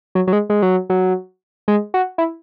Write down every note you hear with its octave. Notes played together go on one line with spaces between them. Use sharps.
F#3
F#3
G#3
G#3
F#3
F#3
G#3
F#4
E4